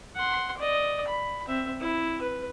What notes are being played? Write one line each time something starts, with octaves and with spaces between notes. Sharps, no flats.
F#5 C6
D5 D#5
B5
C4 E5
E4
B4